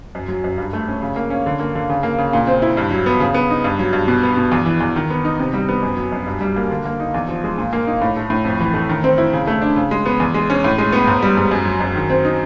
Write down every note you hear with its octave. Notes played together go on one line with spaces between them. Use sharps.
F#2
F#3
F#2
G2
A3
C#4
C#3
A#3
C#4
D3
A#3
D3
C#3
A#3
C#3
A#2
C4
E4
G2
F#3
B3
C#3
B3
D#4
G2
F#3
G2
B2
B3
B2
E2
E3
E2
D#3
B3
D#4
C3
G3
B3
F#2
F#3
F#2
G2
G3
A#3
D3
A#3
D#4
E2
F3
G#3
A#2
A#3
D#4
A2
A3
A2
F2
E3
A3
D#3
C4
E4
C#3
A3
D4
C#3
G#3
B3
E2
G#3
C#4
A2
G#3
B3
G#2
G3
G#2
F#2
F#3
F#2
D#3
C4
D#4